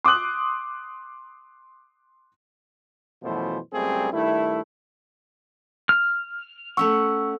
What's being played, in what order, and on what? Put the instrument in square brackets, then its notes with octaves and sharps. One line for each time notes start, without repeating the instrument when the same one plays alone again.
[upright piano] C6 D6 D#6 F#6 F#7
[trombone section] F#2 B2 E3 F3 A3 C5
C#2 F#2 G3 A3 C4 G#4
G2 D#3 A3 E4
[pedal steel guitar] F6
[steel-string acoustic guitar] A3 C#4 F#5 [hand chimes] C#6 E6